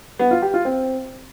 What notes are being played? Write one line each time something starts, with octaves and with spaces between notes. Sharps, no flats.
B3
F4
G4
F4
C4